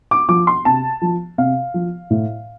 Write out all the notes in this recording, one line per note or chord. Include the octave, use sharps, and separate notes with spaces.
D6
F3 D6
C6
C3 A5
F3
C3 F5
F3
A2